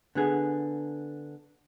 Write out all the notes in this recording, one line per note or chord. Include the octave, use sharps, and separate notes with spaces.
D3 B3 G#4